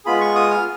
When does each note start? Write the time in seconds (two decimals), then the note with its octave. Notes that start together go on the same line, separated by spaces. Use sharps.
0.05 G#3 B3 F4 G#4 B5
0.21 C#6
0.35 D#6
0.51 F6